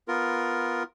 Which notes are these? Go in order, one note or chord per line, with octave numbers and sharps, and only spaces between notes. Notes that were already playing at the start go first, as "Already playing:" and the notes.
B3 F4 A#4